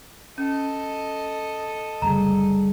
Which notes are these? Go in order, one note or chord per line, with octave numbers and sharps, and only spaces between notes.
C#4 A4 D#5
F#1 D2 G3 G#4 A#5